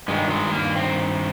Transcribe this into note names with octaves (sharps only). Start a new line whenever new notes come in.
G2 D#3 G#3
G#3
A#3
C4